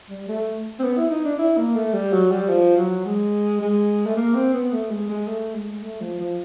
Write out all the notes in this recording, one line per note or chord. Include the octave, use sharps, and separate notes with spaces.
G3
A3
C4
B3
E4
D#4
D4
E4
A#3
A3
G3
F#3
G3
F3
F#3
G#3
G#3
A3
A#3
C4
B3
A3
G#3
G#3
A3
G#3
A3
F3
F3